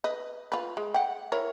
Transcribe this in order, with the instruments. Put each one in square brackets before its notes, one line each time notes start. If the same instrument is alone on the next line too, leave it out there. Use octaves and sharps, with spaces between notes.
[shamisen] B4 D#5
F4 B4
G#3
F#5 G5
E4 A#4 C#5